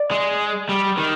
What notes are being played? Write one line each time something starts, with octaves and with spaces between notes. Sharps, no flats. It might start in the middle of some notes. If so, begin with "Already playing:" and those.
Already playing: D5
G#3
G3
D#3